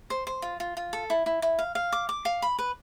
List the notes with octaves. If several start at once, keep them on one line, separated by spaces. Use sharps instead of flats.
C5
C5
F4
F4
F4
A4
E4
E4
E4
F5
F5
D6
D6
F5
B5
B4